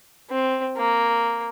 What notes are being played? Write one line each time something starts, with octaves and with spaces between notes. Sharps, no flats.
C4
A#3